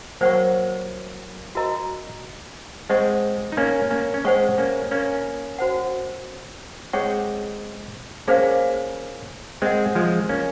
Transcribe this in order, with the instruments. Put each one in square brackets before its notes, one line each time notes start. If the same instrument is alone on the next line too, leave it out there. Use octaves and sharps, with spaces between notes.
[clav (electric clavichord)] F#3 A#3 [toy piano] C5 F#5 C#6
[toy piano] F#4 A#4 D#5 A#5
[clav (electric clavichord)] G#3 C4 [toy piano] C5 D#5 F#5 C#6
[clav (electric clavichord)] D#4
A#3 C#4
A#3 C#4
C#4
[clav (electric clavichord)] G#3 C4 [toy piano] C5 F#5 C#6
[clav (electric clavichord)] A#3 C#4
A#3 C#4
[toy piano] F#4 C5 F#5
[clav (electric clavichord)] G#3 C4 [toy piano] G#4 C#5 F#5 C#6
[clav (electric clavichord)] A#3 C#4 [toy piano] G#4 C5 F5
[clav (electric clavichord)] G#3 C4 [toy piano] A#4 D#5 F#5
[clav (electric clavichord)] F3 G#3
A#3 C#4